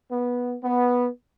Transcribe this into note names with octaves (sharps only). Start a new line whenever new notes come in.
B3
B3